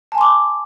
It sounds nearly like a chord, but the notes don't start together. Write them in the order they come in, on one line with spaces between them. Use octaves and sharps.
A5 G#5 C6 D6